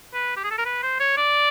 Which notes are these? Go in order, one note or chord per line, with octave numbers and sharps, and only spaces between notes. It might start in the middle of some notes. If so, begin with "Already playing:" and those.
B4
G4
G#4
A4
A#4
B4
C5
C#5
D5